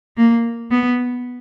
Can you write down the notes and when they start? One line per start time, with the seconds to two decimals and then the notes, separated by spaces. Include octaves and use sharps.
0.17 A#3
0.71 B3